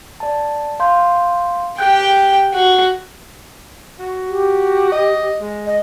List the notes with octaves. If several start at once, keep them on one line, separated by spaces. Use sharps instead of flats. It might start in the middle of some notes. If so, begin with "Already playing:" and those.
D5 A5
F5 C6 G6
G4 G5 F#6 G6
F#4
F#4
G4
D#5
G#3
D#5